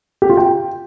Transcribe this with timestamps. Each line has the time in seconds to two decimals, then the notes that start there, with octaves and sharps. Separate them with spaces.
0.22 G4
0.30 F4
0.37 G5